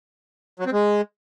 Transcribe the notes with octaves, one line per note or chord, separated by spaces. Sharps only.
F#3
C4
G#3